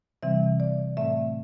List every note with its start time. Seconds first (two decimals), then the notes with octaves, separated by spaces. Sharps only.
0.23 C3 E3 G3 C4 E5
0.60 D5
0.97 A2 A3 C4 E5